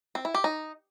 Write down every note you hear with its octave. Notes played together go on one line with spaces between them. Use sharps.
C4
E4
G4
D#4